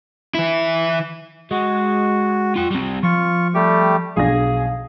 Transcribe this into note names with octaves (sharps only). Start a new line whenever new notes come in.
E3 E4
G#3 F#4
F4 G5
G3 C4
F3 F4 C#6
G3 A3 G4
B1 B2 F3 D4 G#4 F5 A#6